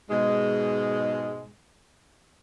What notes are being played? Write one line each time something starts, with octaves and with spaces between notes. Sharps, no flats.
G#2 B2 G#3